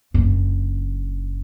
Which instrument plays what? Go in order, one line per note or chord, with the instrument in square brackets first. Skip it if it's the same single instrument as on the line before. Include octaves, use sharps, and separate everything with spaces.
[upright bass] F#1 D4